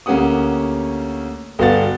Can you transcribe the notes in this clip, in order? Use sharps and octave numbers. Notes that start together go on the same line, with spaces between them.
D2 A#3 C#4 G4 F#5 D#6
G1 B3 F#4 F5 F#5 A6